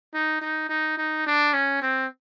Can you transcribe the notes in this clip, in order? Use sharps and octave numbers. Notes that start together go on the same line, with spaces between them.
D#4
D#4
D#4
D#4
D4
C#4
C4